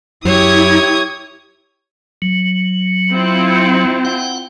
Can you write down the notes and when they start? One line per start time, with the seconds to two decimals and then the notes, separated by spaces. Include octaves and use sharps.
0.25 F#2 F#3 E4 G4 C#5 D#6 G#6
2.22 F#3
3.11 C4 E4 F4
4.05 F#5 G5